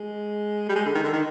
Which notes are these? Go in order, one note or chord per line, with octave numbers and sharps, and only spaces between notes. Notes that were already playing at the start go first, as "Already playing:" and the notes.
Already playing: G#3
G3
G#3
D3
D#3
D3
D#3